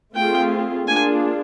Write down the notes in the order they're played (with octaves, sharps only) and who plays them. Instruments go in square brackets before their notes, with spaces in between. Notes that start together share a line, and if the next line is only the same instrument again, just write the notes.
[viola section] A3 C4 F4 G#4 [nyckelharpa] G5
[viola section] A#3 D4 F4 G#4 [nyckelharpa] G#5